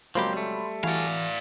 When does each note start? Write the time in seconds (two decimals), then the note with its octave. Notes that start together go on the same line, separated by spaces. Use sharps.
0.15 C#2 F3 F#3 A#3 C4 G4 B5 C6
0.33 G3 A3
0.84 E3 E4 F#4 D5 F5 G#5